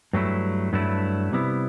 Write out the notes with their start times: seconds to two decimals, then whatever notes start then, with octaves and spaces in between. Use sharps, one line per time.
0.13 G2 F#3 A3 E4
0.73 G2 F#3 A3 E4
1.32 C3 G3 B3 E4